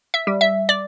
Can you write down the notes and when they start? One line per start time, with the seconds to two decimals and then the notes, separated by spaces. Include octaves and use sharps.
0.14 E5
0.27 G3
0.41 E5
0.69 D5